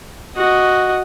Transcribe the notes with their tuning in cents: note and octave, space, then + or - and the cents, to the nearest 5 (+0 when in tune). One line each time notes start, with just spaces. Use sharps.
F#4 +0 D#5 +0